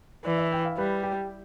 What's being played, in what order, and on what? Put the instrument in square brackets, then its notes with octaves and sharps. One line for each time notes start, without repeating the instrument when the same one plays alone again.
[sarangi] E3 [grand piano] D5
[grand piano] E5
G5
F5
[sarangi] G3 [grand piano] B4
[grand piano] G4